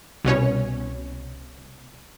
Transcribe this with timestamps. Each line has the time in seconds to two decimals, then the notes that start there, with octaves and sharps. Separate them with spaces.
0.25 C2 B2 C#4 C#5